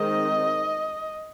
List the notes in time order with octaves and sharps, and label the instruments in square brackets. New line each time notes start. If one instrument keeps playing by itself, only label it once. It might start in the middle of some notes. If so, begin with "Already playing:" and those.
Already playing: [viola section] D#3 G#3 C4 D#5